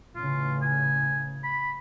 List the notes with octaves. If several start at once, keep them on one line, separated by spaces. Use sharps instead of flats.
A1 C#3 F4
G#5
B5